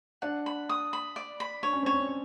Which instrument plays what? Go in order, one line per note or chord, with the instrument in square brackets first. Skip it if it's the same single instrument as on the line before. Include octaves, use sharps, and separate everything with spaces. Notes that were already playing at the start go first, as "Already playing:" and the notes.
[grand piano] D4 [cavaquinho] F#5
[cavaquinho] B5
D#6
B5
D5
B5
[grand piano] D4 [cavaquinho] C#5
[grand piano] C#4
[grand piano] C4 [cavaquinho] C#5
[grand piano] C#4